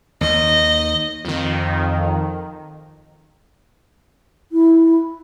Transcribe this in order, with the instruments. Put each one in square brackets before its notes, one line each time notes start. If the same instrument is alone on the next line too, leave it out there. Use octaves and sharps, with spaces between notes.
[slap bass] D#2 D#3 [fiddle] D#5
[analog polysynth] F2 D#3
[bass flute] E4